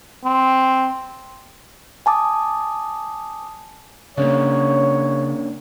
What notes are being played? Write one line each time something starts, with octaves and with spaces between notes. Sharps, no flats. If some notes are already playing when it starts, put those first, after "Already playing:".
C4
G#5 A5 D6 D#6
C#3 A#3 C#4 D4 C#5